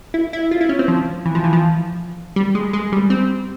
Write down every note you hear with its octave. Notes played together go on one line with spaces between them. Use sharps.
E4
E4
F4
E4
C#4
C4
F3
E3
F3
E3
F3
G3
G#3
G#3
G3
C4